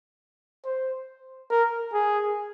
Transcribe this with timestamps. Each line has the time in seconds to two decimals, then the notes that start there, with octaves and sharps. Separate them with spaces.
0.65 C5
1.51 A#4
1.93 G#4